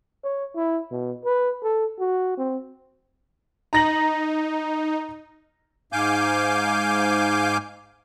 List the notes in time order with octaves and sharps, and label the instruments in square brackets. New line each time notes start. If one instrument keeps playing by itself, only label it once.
[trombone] C#5
E4
B2
B4
A4
F#4
C4
[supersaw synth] D#4 [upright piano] A#5 A#6 F#7
[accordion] G#2 F5 G#5 D6 G6